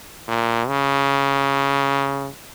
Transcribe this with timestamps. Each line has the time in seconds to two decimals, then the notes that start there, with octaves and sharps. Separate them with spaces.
0.28 A#2
0.68 C#3